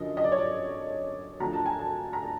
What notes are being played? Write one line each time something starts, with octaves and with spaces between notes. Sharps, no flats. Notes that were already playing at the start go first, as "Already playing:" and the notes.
Already playing: F#2 D3 F3 D#5
D#5
D5
C#5
D5
D2 D3 F3 A#5
A5
G#5
A5
A#5
A5